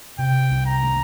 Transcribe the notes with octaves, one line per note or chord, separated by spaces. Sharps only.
C3 G5
C2
A#5
A3